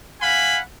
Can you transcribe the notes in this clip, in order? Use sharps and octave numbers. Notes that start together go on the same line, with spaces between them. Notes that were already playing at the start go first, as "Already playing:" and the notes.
F5 F#5 G#5 B5